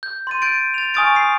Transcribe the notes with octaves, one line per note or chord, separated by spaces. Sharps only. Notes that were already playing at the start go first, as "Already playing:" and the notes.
G6
C6 A6 D#7
G6 A6 D7
A6 F7
G#5 C#6 D#6 F6 A6 D7
D#6 C7